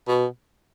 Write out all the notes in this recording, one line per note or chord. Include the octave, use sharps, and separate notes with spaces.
B2